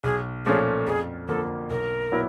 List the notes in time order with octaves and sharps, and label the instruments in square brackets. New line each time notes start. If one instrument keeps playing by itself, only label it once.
[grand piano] B1 [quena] G#4
[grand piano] A#2 F3 A3 C#4 [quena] G#4
[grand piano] F2 [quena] G#4
[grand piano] D3 F3 A#3 [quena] A4
[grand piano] B1 [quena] A#4
[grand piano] A#2 F#3 B3 E4